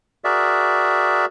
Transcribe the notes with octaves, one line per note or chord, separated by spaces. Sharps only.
F#4 G#4 A#4 D5 E5